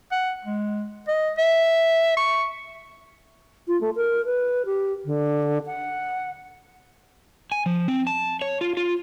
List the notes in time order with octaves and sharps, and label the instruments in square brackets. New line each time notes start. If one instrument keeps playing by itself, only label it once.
[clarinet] F#5
G#3
D#5
E5
C#6
[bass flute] F4
A3
A#4
B4
G4
D3
F#5
[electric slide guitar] G#5
F3
C4
A5
C#5
F4
F4